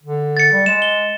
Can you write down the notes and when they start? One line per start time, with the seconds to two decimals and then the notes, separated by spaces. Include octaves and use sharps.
0.03 D3
0.37 A6 C#7
0.52 G3
0.66 G#3 E7
0.82 G7